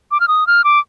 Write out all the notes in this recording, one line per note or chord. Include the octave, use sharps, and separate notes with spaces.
D6
F6
D#6
F6
D6